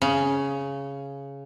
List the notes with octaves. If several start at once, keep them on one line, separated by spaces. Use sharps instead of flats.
C#3